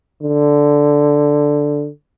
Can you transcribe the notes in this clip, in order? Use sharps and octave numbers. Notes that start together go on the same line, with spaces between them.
D3